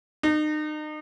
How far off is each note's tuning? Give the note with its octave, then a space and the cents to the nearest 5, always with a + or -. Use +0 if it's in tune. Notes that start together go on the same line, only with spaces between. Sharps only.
D#4 -35